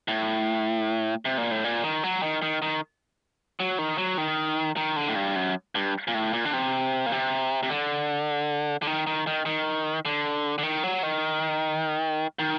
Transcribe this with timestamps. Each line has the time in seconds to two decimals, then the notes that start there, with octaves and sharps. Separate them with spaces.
0.08 A2
1.25 C3
1.38 A#2
1.51 A2
1.64 A#2
1.83 D#3
2.04 F#3
2.23 D#3
2.42 D#3
2.62 D#3
3.60 F#3
3.78 D#3
3.98 F#3
4.18 D#3
4.77 D#3
4.96 D3
5.08 A2
5.16 G2
5.36 F#2
5.75 G2
6.08 A#2
6.14 A2
6.33 A#2
6.45 D3
6.53 C3
7.06 A#2
7.12 C3
7.63 C3
7.70 D3
8.82 D3
8.87 D#3
9.07 D#3
9.27 D#3
9.45 D#3
10.05 D3
10.58 D3
10.63 D#3
10.84 F#3
11.03 D#3
12.39 D#3